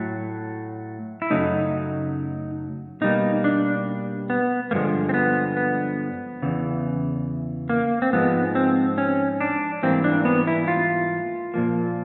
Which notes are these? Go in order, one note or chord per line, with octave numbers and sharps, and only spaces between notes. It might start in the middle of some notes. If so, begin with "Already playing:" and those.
Already playing: A2 F#3 A3
E4
F#2 C#3 F#3 A3 D#4
B2 G3 A#3 D#4
D4
B3
G2 D3 F3 G#3 A#3
C4
B3
B3
E2 C#3 E3
A#3
C4
G#2 F3 G#3 B3
C4
C#4
D4
G#2 E3 G3 A#3 C4
D4
B3
E4
F4
A#2 F3 A#3